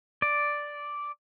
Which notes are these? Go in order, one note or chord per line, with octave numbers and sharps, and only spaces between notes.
D5